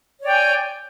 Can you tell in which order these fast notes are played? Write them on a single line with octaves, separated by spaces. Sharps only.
C#5 D5 G5 G#5